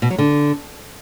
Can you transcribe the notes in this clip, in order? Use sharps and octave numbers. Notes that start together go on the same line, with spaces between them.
B2
F#3
D3